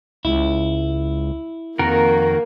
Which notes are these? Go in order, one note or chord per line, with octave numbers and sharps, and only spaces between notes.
C#2 E4
F2 D#3 A#3 F#4 A#4